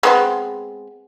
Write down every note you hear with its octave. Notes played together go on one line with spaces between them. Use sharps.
G#3 B3 C4